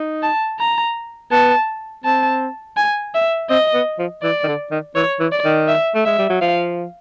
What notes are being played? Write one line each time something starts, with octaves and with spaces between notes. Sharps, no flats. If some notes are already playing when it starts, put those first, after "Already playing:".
Already playing: D#4
A5
A#5
B3 A5
C4 A5
G#5
E5
C4 D#5
B3
F3
E3 D5
D#3
D3
D#3
E3 C#5
E3
D5
D#3
E5
A3
G#3 E5
G3
F#3
F3 F5